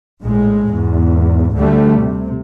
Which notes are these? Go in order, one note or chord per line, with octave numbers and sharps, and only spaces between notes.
A#1 A2 G#3
E2 G#2
D2 D3 G3 A3
C3